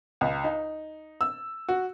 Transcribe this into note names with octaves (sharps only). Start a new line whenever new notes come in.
C#2
D#4
E6
F#4